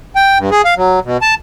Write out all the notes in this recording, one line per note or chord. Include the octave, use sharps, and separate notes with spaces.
G5
G2
G#4
F5
F#3
B2
A5